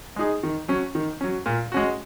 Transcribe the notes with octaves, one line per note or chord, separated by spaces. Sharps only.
G#3 D#4 G#4
D#3
F#3 C#4
D#3
F#3 C#4
A#2
G#3 C#4 F#4